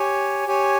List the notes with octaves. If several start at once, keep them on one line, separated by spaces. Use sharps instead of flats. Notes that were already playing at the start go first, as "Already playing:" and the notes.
Already playing: G4 C#5 G#5
G4 C#5 G#5